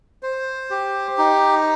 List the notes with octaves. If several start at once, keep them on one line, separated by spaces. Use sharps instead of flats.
C5
G4
D#4